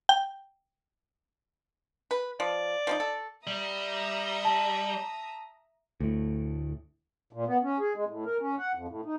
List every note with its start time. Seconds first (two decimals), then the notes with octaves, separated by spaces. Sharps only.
0.09 G5
2.11 B4
2.40 F3 D5
2.87 F3 C4 D#4
3.00 A4
3.47 G3 E5 A#5 D#6
4.45 A5
6.00 D2 A2
7.33 A#2
7.47 B3
7.63 C#4
7.80 G#4
7.95 G#3
8.08 A2
8.26 A#4
8.40 C#4
8.59 F#5
8.75 F2
8.88 A2
9.05 D#4